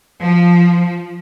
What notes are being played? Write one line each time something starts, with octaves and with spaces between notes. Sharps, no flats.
F3